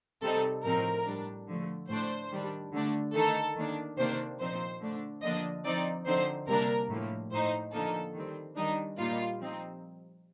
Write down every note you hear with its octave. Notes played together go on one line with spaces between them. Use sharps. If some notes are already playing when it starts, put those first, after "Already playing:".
C3 G3 C4 D#4 A4
A2 F3 C4 D#4 A#4
A2 G3 D4
D3 F3 A3
A2 A3 D4 C5
D#3 G3 D4
D3 A3 D4
D#3 A3 D#4 A4
D#3 A#3 D4
C3 D#3 A#3 D4 C5
A#2 F3 C4 D#4 C5
D3 A3 D4
D3 F3 A#3 D4 D#5
F3 C4 D#4 D5
D3 F3 C4 D#4 C5
C3 G3 A#3 D4 A#4
A2 F3 A#3
A2 A3 D#4 C5
D3 F3 A#3 D#4 A4
D#3 G3 C4
D#3 G3 D4 D#4
A#2 G3 A#3 D#4 F4
F3 C4 D#4